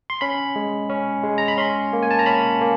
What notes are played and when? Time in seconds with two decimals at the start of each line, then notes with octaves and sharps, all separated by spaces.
0.10 C6
0.21 C#4 B5
0.56 G#3
0.90 C#4
1.24 G#3
1.38 A#5
1.48 B5
1.58 C#4 C6
1.93 A#3
2.03 G#5
2.11 A5
2.19 A#5
2.26 C#4 B5
2.61 A#3